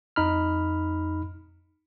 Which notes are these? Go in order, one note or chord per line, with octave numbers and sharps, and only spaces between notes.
F2 D#4 B5 F6